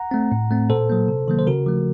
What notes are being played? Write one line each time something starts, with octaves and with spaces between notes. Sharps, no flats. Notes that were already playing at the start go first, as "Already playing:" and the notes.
Already playing: F#5 A#5
A3 C4
A2
A3 C4
A#2 A4 C5
F#3 A#3
C3
D#3 F#3 A#3
C5
C#3 F#4 A#4
F3 A3